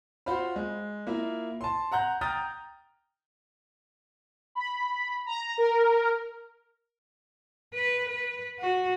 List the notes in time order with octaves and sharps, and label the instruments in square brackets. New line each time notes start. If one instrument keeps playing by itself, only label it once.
[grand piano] F4 F#4 C5 F5 B5
G#3
A#3 E4 F4
A5 C6
F#5 A#5 F#6 G6
G5 A#5 D#6 F6 G6 A6
[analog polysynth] B5
A#5
A#4
[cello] B4
B4
F#4